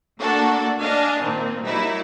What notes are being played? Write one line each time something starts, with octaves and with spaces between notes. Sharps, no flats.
A3 A#3 D4 F#4 A4
D4 D#5 F5 G#5 A5
A#2 D#3 A#3 C4
F#3 G3 A#3 D#4 E4